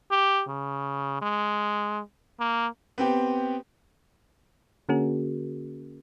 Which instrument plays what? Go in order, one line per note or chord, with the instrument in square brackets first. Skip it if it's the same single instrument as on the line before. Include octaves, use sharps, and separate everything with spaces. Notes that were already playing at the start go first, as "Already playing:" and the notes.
[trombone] G4
C#3
G#3
A#3
[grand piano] B3 C4 G4
[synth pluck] D3 A#3 C#4 F#4 G#4 A#4